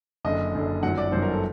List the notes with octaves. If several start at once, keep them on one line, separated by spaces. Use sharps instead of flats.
F#1 F#2 D3 D#5
F#1 F#2 D3
G1 F#2 D#3 F#3 F#5
D5
G1 F#2 D#3 F#3 C5
A#4
A4